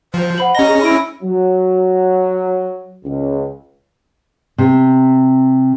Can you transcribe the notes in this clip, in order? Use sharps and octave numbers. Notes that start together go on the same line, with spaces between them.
F3 C5
F#5 B5 F#7
C#4 G4 D#5 A#5 A#6 G7
G#4
E4 B5 D7
F#3
C#2
C3